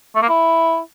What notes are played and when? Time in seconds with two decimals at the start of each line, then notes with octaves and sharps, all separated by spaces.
0.16 A3
0.22 A#3
0.29 E4